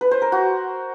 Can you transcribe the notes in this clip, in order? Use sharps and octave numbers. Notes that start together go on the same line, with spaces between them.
B4
C5
A#4
F#4